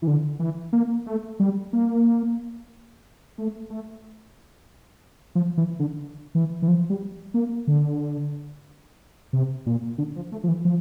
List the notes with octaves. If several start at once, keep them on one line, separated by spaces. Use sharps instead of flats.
E3
D3
E3
A#3
A3
G3
A#3
A3
A3
F3
E3
D3
E3
E3
F3
G3
A#3
D3
C3
A#2
D3
F3
A3
F3
E3
F3